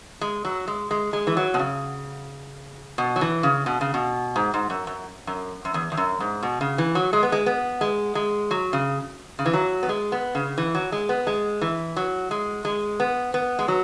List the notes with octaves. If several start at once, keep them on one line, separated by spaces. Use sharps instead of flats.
G#3
F#3
G#3
G#3
G#3
E3
F#3
B2
C#3
B2
F#3
E3
C#3
B2
C#3
B2
G#2
G#2
F#2
F#2
F#2
F#2
E2
E2
F#2
G#2
B2
C#3
E3
F#3
G#3
B3
G#3
B3
G#3
G#3
F#3
C#3
C#3
E3
F#3
B3
G#3
B3
C#3
E3
F#3
G#3
B3
G#3
E3
F#3
G#3
G#3
B3
B3
G#3
F#3